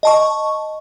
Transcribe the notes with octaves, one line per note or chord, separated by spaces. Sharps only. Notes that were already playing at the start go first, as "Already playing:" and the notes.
D#5 A5 C#6